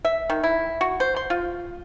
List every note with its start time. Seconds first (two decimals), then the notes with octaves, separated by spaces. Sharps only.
0.05 E5
0.30 D#3
0.43 E4
0.81 F#4
1.00 C5
1.16 C6
1.30 F4